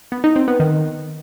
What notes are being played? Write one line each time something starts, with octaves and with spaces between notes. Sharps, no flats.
B3
D#4
C4
B3
D#3